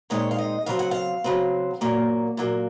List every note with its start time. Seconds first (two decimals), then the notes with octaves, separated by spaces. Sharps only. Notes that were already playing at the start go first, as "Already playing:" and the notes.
0.10 A#2 G#3 C4 D#4 C#5
0.31 F5
0.38 D#5
0.66 C#3 F#3 C4 F5
0.79 F#5
0.91 F5
1.24 C#3 F#3 C4
1.81 A#2 F#3 A#3
2.37 A#2 F#3 A#3